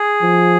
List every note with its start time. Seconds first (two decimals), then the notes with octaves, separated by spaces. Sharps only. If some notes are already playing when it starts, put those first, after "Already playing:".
Already playing: G#4
0.22 F3